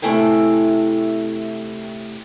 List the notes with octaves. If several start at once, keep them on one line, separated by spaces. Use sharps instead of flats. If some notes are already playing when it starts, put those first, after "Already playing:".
C3 A3 E4 A4 G5 G#5